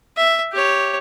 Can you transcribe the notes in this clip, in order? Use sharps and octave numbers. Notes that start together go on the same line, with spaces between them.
E5
G4 C#5